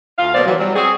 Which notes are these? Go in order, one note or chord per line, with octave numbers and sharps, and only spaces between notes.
D2 F4 F5
B2 F#3 A#3 C5 D5
E3 F#3
F#3 G3
C4 F#4 G#4